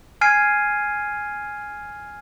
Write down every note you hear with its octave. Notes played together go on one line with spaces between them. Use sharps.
G#5 F6 G#6 C7 D7 D#7